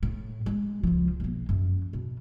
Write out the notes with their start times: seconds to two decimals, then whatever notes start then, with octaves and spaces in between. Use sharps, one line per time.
0.03 A2
0.46 G#3
0.83 C#2 F3
1.20 B1 A#3
1.49 F#2
1.93 B2